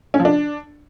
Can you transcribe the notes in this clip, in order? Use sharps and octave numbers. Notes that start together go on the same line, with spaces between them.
C#4
F3
D4